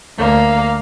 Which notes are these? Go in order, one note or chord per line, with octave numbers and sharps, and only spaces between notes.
D2 A#3 F5